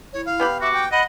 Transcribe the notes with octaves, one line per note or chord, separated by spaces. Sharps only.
E4 C#5
F5
B3 G4 B5
F#4 E5 D6
G5
D#5 F#5 B5